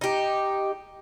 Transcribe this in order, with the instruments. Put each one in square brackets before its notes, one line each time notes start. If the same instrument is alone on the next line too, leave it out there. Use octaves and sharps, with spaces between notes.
[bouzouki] D#4 G4